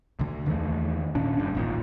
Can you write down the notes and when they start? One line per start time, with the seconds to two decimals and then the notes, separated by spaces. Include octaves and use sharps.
0.19 D2 D3
0.46 E2 D#3 E3 A3
1.15 A#2 D3 C#4 D4
1.38 F#1 G2
1.55 A1 D#2 A#2